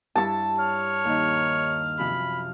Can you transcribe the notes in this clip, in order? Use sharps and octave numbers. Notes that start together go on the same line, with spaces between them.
G2 E4 A5 C#6 E6
C#5 F6
D#2 D#3
F#2 C3 F3 B5